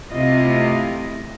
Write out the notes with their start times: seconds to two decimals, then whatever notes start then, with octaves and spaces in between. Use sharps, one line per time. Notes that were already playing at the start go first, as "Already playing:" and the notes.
0.11 C3 A3 E4 F4 D#5